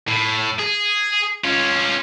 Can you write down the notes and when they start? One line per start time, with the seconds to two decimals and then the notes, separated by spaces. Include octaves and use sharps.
0.08 A2
0.60 G#4
1.44 C#4 F4